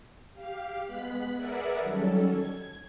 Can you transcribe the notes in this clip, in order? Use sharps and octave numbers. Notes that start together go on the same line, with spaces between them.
G4 F5
G#3 B3 F#6 B6
G#4 A#4 B4 D5 E5 F#5
D#3 F#3 G3 C#4 A4
G#6